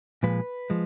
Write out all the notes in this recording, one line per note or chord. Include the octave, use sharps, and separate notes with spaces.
A#2 F3 G#3 B4
F3 G#3